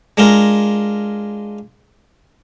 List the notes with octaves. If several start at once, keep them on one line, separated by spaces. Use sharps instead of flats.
G#3 D4 F4 A#4